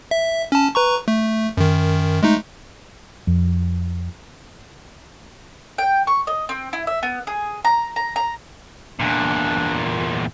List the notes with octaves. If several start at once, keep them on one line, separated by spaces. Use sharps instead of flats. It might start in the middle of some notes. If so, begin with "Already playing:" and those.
E5
C#4 A5
B4 A#5 C#6
A3
F#2 D#3
G#3 A3 D#4
F2
G5
C#6
D#5
C4
E4
E5
B3
G#4
A#5
A#5
A#5
E2 A#2 D4